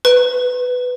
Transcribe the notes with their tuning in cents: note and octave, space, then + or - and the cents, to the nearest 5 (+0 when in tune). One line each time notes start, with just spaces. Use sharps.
B4 +10